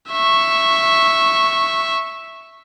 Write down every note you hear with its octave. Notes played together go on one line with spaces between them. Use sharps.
E5 C#6